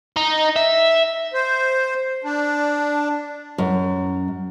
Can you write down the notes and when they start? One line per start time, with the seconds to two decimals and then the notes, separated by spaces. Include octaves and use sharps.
0.17 D#4
0.56 E5
1.33 C5
2.24 D4
3.58 F#2